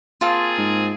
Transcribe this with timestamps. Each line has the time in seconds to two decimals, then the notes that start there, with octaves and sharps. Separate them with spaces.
0.21 A#3 C4 F4 G#4 A5
0.58 G#2